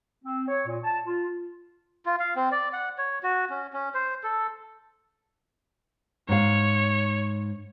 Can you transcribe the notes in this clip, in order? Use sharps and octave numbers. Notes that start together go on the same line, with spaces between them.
C4
C#5
A#2
A5
F4
F4
F5
C4
D5
F#5
C#5
F#4
C#4
C#4
C5
A4
G#2 C#5 F5